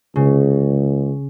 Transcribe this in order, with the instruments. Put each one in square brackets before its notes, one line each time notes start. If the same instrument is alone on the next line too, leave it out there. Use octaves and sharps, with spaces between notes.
[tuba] C#2 [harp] C#3